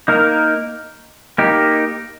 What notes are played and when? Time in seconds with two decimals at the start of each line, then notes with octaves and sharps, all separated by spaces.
0.08 A#3 D#4 A#4
1.38 A#3 D#4 G4